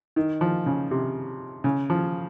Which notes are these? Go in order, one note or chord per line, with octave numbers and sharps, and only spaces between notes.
D#3
F3
C#3
C3
C#3
F3